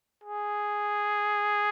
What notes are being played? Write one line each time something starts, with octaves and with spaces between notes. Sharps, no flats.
G#4